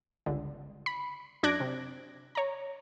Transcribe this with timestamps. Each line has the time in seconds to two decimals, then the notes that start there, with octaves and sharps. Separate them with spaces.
0.26 G1 C#2 D3
0.86 B5
1.43 F#2 D4 F#6 G#6 A#6 D7
1.60 C3
2.35 C#5 A#5